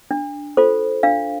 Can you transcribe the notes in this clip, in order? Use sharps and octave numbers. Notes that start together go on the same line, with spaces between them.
D4
F4 A4 C5
D4 F5